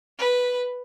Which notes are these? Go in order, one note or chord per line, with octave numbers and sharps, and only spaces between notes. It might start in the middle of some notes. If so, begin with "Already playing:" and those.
B4